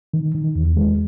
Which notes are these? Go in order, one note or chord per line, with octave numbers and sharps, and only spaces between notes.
D#3
D#3
E2
G#3